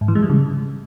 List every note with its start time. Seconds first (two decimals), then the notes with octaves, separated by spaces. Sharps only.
0.01 G#2
0.08 E3
0.15 G#3
0.22 G3
0.30 C#3